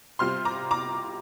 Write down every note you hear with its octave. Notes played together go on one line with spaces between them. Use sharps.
C3 G3 C4 F4 C6 F6
A#5 D6
A#5 D6